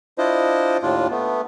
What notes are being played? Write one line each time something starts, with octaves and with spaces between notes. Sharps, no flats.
D4 E4 F4 C5 D#5
D#2 A2 D4 F4
A3 B3